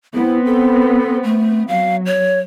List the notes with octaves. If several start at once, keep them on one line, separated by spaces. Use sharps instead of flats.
B3 C4 E4
A4
A3
F#3 F5
C#5